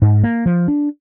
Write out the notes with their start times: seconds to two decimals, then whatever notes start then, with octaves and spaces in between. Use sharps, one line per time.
0.02 G#2
0.23 A#3
0.46 F3
0.68 D4